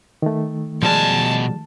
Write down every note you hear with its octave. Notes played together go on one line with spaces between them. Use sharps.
D#3 A3
B2 F3 G3 G#3 G#5 A5